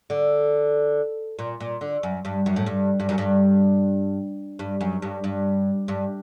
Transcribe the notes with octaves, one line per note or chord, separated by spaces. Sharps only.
D3
A#2
A#2
D3
F#2
G2
F#2
A2
G2
G2
F#2
G2
G2
F#2
G2
G2
G2